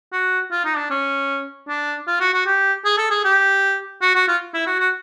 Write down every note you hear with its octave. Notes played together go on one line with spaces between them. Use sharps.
F#4
F4
D#4
D4
C#4
D4
F4
F#4
F#4
G4
G#4
A4
G#4
G4
F#4
F#4
F4
E4
F#4
F#4